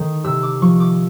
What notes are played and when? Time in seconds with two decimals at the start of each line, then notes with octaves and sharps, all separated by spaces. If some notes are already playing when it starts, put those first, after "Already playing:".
Already playing: D#3 A3
0.24 C3 E6
0.43 D6
0.62 F3 C#6
0.80 D6